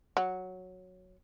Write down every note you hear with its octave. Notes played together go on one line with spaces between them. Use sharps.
F#3